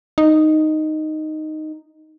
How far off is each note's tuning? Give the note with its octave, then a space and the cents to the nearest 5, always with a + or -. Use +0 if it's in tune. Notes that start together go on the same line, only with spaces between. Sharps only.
D#4 -5